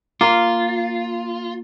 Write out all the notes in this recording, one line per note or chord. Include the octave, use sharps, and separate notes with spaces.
A#3 F4